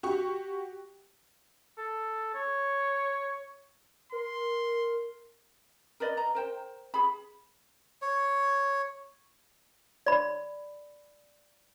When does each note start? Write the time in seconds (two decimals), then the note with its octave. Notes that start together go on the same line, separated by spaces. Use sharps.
0.03 F#4 G4 C#6
1.77 A4
2.34 C#5
4.12 A#4 C6
6.00 A#4 B4 D5 D#5
6.17 D#5 A#5
6.35 A#4 C5 G5
6.94 G#4 B5
8.02 C#5
10.06 D5 B5